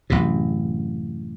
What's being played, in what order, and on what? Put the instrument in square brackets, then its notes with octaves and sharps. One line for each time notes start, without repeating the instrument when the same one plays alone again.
[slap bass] A1 F#2 C3